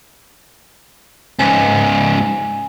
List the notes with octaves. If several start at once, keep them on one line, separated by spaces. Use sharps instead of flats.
C#2 G#2 G#5